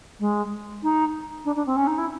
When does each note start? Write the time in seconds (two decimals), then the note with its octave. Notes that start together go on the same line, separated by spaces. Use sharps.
0.19 G#3
0.83 D#4
1.45 D4
1.55 D4
1.66 C4
1.76 C#4
1.87 D#4
1.98 E4